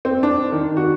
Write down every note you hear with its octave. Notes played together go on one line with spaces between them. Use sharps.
C4
D4
D#3
F#4